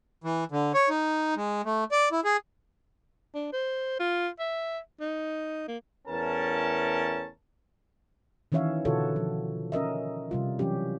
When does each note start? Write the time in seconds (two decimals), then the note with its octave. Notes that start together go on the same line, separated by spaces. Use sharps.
0.24 E3
0.52 D3
0.74 C#5
0.89 D#4
1.36 G#3
1.65 A3
1.92 D5
2.12 E4
2.25 G#4
3.34 D4
3.53 C5
4.00 F4
4.39 E5
5.00 D#4
5.68 A#3
6.08 E2 A2 C#4 A#4 A5
8.52 D#3 E3 C#4 C#5 E5 F5
8.85 B2 D3 F4 F#4 A4 C#5
9.16 F3
9.72 C#4 A#4 D#5 E5
10.31 C3 G3 F4
10.59 E3 F#3 C#4 G4